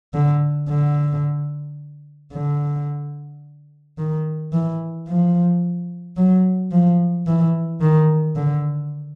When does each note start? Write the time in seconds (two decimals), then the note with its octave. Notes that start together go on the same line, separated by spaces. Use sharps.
0.14 D3
0.69 D3
2.33 D3
3.98 D#3
4.53 E3
5.08 F3
6.17 F#3
6.72 F3
7.27 E3
7.81 D#3
8.36 D3